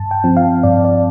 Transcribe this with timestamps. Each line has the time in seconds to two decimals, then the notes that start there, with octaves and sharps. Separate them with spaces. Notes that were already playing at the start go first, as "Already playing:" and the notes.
Already playing: G2 A5
0.11 G5
0.24 F3 C4
0.37 F5
0.63 G2 D5
0.85 D5